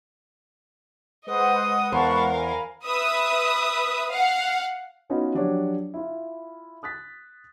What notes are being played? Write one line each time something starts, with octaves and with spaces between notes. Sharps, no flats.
G#3 B4 C5 D#5 F#5 D#6
E2 A#4 C5 F5 A5 B5 C#6
G#5 A#5 B5
B4 E5 D#6
F5 F#5
B3 C#4 D#4 F4 F#4 B4
F3 F#3 D4 F#4 G4 C#5
E4 F4
D#6 F#6 A6 B6